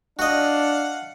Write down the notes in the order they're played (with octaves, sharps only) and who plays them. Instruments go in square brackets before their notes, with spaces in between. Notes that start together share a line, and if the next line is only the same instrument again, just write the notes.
[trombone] D4 [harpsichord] F#4 D#5 [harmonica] F5 F#5